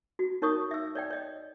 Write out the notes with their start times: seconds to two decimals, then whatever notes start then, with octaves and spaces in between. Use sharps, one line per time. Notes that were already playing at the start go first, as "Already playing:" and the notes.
0.19 F#4
0.42 D#4 A#4 C#5 C#6 D#6
0.71 E5 E6
0.95 C#5 D5 G5
1.10 C#5 D#5